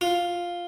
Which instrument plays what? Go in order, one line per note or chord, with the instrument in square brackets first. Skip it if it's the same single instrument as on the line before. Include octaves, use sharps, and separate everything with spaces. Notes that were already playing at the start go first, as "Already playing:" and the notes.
[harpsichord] F4